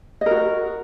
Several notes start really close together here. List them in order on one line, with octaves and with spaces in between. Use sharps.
D#5 A#4 F#4